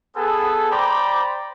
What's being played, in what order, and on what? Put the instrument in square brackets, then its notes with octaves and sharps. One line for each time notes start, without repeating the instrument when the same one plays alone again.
[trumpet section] B3 G#4 A4
C5 D5 G5 A#5 B5 D6